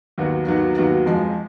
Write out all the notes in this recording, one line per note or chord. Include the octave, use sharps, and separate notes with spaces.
D#2 D#3 F#3 B3 F#4
D#2 D#3 F#3 B3 F#4
D#2 D#3 F#3 B3 F#4
F2 F3 G#3